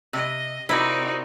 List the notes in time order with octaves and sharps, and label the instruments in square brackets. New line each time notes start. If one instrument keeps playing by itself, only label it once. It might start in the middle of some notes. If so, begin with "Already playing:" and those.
[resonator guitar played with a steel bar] C3 [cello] D#5
[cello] C3 [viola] D#4 F#4 [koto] E4 [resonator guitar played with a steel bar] A#4 D5